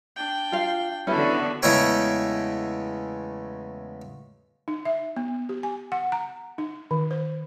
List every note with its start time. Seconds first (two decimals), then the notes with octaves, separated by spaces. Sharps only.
0.16 D4 G5
0.52 F4 F5
1.07 D3 B3 C#4 E4 F#4 A4 B4
1.63 E2 C#3 G#3 A3 C#5 G5
4.68 D#4
4.85 E5
5.16 B3
5.49 G4
5.63 G#5
5.92 F#5
6.12 A#5
6.58 D#4
6.91 D#3
7.11 C5